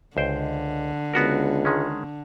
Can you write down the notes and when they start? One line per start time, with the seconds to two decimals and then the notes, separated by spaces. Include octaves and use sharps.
0.17 C#2 D3 C5 G5
1.14 C#2 B3 F#4 A#4
1.65 D#3 G#3 C#4